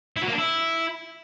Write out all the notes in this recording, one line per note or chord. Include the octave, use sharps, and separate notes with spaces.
E4
F#3
A#3
D4
E4